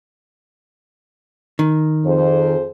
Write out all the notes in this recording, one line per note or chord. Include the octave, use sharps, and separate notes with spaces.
D#3
F2 G#4 C5